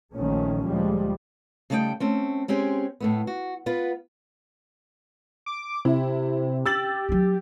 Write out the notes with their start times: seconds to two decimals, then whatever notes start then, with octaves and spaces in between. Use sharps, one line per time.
0.15 A#1 A#2 D#3 F3 A3 C#4
0.65 D2 F3 G3 G#3
1.70 C#3 G3 A3 D#4 F5 G5
2.00 A3 C4 C#4
2.48 G#3 C4 C#4 G4 G#4
3.00 A2 A3 B3
3.27 F#4
3.66 B3 F4 B4
5.46 D6
5.85 C3 E4
6.66 G4 E6 A6 F#7
7.09 F#3 C#4